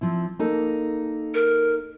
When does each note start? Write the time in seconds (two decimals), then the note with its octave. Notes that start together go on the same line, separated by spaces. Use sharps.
0.01 F3 C4 E4
0.39 A#3 D#4 A4
1.34 A#4